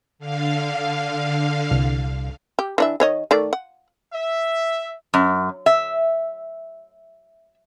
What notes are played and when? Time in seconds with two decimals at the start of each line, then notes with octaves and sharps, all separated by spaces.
0.19 D3 F5
1.71 C2
2.59 G4
2.78 E3 D4 E5
3.00 D#3 C#5 D#5
3.31 D#3 A3 D5
3.53 F#5
4.13 E5
5.14 F#2
5.66 E5